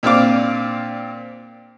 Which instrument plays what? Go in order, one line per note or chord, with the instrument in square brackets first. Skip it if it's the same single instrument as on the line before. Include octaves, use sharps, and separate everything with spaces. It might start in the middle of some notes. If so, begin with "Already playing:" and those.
[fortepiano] A#2 C4 D4 F5 D6